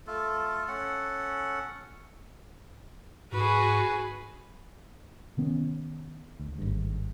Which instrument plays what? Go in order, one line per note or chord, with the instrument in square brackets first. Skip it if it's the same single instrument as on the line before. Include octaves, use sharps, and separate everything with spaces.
[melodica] A3 F4 A4
C#4 A4 F#5
[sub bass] G#2 [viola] F#4 [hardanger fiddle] G#4 B4
[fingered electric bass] C3 D#3 B3 C#4
D2
G#1 G2